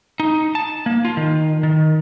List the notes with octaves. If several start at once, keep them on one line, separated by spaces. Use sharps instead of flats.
D#4
A5
A#3
F4
D#3
D#3